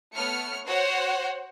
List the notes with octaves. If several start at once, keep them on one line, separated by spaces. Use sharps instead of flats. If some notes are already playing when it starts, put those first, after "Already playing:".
A3 B3 C#5 F6 C#7
F#4 C5 C#5 F#5